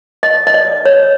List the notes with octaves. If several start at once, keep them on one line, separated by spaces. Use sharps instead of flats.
D#5
D#5
D5
C#5